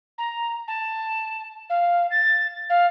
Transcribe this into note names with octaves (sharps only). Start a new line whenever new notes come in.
A#5
A5
F5
A6
F5